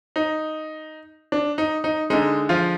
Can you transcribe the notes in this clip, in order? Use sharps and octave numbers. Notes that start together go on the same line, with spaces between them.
D#4
D4
D#4
D#4
D3 G#3 D#4
F3 F4